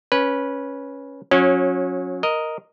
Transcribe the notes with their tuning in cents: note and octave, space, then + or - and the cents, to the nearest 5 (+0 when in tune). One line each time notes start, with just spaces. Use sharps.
C#4 +0 B4 -15
F#3 -35 C#4 -10
A#4 +0 D#5 +0